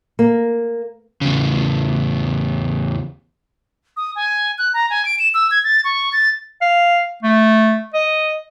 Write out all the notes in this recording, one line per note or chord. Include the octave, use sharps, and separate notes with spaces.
A#3
E2 C#3
D#6
G#5
F#6
A#5
G#5
D7
E7
E6
G#6
A6
C#6
A6
F5
A3
D#5